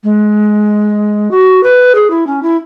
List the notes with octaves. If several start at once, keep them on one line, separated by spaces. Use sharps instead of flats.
G#3
F#4
B4
G#4
E4
C#4
E4